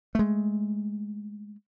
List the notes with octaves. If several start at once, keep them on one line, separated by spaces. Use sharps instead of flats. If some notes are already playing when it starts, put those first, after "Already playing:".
G#3 A3